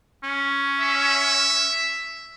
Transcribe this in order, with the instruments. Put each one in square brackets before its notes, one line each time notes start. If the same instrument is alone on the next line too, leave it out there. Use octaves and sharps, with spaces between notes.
[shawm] C#4
[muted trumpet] E5